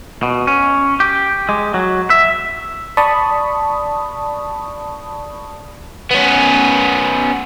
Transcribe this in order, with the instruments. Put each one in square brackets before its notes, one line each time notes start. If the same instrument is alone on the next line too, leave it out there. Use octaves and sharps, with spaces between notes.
[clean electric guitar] B2
C#4
G4
G#3
F#3
E5
[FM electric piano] D5 A5 B5 C#6 D#6
[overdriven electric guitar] B3 C#4